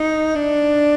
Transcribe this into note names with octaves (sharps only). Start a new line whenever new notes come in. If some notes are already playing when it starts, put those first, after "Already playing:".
Already playing: D#4
D4